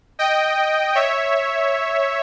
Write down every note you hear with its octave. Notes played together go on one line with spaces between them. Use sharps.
D#5 G5
C#5 E5